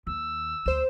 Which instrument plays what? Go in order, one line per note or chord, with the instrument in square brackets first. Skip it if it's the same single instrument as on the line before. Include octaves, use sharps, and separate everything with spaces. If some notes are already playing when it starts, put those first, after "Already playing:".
[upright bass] D#2 [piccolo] E6
[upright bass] D2 [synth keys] C5 E7